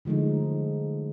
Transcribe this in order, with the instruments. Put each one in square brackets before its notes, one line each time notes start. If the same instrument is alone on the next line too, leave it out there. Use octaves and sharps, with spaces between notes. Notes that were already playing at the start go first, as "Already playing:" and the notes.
[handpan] D3 F3 G#3 A3 D#4